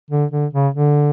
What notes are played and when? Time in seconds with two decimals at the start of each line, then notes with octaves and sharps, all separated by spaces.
0.10 D3
0.31 D3
0.53 C#3
0.75 D3